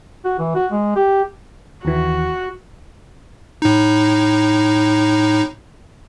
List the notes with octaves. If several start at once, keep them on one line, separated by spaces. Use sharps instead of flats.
F#4
E3
F#4
G#3
G4
D#2 E3 F#4
A2 D#4